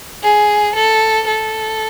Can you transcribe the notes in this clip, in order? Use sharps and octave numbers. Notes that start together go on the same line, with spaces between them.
G#4
A4
A4